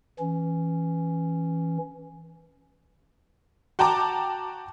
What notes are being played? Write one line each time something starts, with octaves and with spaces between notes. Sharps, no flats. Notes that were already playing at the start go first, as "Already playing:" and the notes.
E3 C#4
F#4 G5 A5 A#5 D6